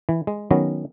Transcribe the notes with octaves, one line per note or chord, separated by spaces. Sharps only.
E3
G#3
D#3 F#3 B3 C#4